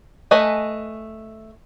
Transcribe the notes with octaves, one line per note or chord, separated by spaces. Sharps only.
A3 B4 D#5 G#5